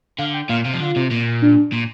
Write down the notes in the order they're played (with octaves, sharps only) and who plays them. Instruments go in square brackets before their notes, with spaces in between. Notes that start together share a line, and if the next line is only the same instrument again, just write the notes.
[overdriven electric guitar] D3 [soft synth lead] F5
[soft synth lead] G5
[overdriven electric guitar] A#2 [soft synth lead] F5
[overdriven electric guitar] C3 [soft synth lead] F5
[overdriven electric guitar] F3
[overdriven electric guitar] D3 [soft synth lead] F4
[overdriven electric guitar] C3
A#2
[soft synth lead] D4
[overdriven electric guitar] A#2